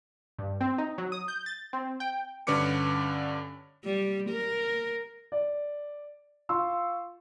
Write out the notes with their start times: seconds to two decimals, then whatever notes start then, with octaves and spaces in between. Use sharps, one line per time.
0.39 G2
0.61 C4
0.78 D#4
0.98 F#3
1.12 D#6
1.28 G6
1.46 A6
1.73 C4
2.00 G5
2.47 G2 D3 C#4 B4 D6 C#7
3.84 G3
4.29 A#4
5.32 D5
6.49 F4 F5 C6 C#6 E6